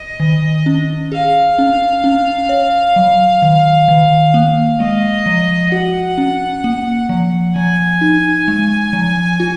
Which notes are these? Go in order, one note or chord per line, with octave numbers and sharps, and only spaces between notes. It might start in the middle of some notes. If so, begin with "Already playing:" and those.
Already playing: D#5
D#3
C#4
G#4 F5
C#4
C#4
C#5
F#3
D#3
D#3
A#3
G#3 D#5
F3
F#4 F#5
C#4
A#3
F3
F3 G#5
D#4
G#3
F3
F4